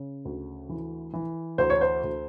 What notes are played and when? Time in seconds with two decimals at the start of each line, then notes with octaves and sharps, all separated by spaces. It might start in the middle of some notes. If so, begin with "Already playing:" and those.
Already playing: C#3
0.25 D2
0.69 E3
1.13 E3
1.58 D2 C5
1.70 C#5
1.81 C5
2.04 D2